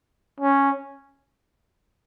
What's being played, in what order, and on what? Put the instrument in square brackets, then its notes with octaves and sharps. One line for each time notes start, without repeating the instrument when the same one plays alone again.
[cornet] C#4